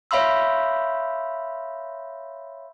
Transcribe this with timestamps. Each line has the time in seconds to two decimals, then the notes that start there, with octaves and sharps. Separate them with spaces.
0.11 C#5 E5 F5 B5 C6 E6